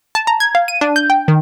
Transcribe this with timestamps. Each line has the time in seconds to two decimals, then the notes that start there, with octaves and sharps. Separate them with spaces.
0.15 A5
0.27 A#5
0.40 G#6
0.55 F5
0.68 D#7
0.81 D4
0.96 G6
1.10 G5
1.28 D#3